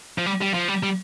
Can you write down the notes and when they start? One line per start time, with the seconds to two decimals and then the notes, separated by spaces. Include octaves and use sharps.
0.18 F3
0.26 G3
0.41 G3
0.54 F3
0.68 G3
0.83 G3